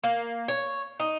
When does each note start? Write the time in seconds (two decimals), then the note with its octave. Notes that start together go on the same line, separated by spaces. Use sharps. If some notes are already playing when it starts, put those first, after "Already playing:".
0.04 A#3
0.48 C#5
0.99 D#4